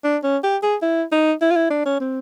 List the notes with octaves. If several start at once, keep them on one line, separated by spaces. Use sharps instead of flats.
D4
C#4
G4
G#4
E4
D#4
E4
F4
E4
D4
C#4
C4